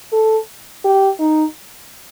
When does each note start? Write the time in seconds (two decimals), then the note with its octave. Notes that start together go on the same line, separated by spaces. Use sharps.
0.12 A4
0.85 G4
1.19 D#4